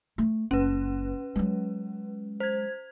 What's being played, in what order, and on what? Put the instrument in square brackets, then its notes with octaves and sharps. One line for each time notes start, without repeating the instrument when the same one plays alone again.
[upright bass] A3
[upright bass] F#1 [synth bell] C#4 B4
[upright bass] F#3 G#3
[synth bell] C5 G#6